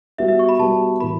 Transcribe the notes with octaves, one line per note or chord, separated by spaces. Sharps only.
G3 B3 F#4 E5
E5
C#6
B5
G3 B3 F#4 A5
A2 E3 B3 B5